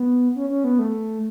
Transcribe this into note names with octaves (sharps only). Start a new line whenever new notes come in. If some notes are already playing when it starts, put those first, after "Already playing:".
Already playing: B3
C#4
C#4
B3
A3